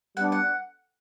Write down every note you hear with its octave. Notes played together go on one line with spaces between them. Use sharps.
G3 B3 D4 F#5
F#5